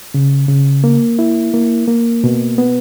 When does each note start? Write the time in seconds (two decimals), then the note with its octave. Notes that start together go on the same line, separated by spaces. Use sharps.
0.14 C#3
0.48 C#3
0.84 A#3
1.19 E4
1.54 A#3
1.88 A#3
2.24 B2
2.58 B3